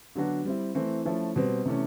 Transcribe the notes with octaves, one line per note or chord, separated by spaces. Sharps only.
D3 F#3 B3 D4 F#4
G3 C4 E4
E3 A3 C4 E4
F3 A3 C#4 E4
B2 G3 C4
C3 E3 A3 C#4